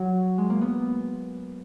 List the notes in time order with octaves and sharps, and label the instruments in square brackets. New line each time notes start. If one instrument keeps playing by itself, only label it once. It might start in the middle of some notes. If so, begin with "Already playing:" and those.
Already playing: [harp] F#3
G#3
A#3
B3